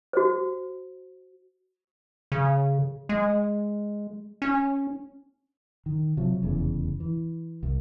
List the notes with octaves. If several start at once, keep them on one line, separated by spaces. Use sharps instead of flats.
F#4 C5
C#3
G#3
C#4
D#3
C3 F3 F#3
F1 E2 C#3
E3
C2